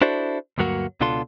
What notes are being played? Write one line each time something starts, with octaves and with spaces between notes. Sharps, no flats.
D4 E4 F#4 A4 C5 D5
D2 G2 F#3 A#3 F#4
C#2 B2 D4 F4 A4 C6